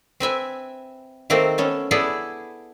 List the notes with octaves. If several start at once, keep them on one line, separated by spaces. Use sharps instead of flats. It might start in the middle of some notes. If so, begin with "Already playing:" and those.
C4 B4 E5 G#5
D#3 A3 A#3 C4 A#4 C5
B3 C#4 A4
B3 E4 G#4 A4 D5